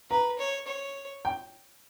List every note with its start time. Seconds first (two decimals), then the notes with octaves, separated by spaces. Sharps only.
0.10 B4 A#5
0.39 C#5
0.67 C#5
1.25 G5